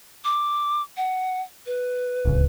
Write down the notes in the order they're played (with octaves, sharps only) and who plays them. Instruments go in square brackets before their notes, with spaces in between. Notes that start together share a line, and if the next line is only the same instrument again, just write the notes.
[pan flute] D6
F#5
B4
[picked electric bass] D1 C#2